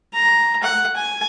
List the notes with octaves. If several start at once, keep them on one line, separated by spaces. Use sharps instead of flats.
A#5
F#5
G#5